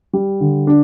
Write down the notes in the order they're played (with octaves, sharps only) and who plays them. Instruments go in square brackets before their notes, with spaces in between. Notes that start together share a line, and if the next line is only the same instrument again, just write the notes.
[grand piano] G3
D3
D4